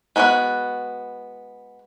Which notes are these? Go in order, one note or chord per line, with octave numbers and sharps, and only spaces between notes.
G#3 B3 F#4 B4 F#5